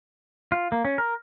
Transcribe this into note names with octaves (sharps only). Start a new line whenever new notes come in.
F4
A#3
C#4
A#4